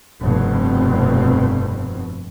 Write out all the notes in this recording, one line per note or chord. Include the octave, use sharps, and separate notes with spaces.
F1 G2 B2 C4